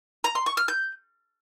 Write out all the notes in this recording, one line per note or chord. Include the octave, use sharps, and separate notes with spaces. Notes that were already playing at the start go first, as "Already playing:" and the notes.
A#5
C6
C#6
F6
G6